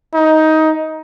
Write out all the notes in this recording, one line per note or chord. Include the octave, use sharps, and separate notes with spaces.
D#4